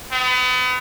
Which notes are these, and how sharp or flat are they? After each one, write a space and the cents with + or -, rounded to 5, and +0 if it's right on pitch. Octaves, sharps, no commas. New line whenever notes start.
B3 +35